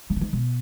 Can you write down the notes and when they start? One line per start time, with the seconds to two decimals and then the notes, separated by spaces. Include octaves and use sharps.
0.10 D#3
0.16 C#3
0.21 D#3
0.33 B2